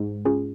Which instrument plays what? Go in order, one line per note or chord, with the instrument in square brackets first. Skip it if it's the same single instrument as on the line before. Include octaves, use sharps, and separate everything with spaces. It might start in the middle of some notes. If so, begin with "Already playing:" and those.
Already playing: [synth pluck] G#2
[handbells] C#4 F4 G#4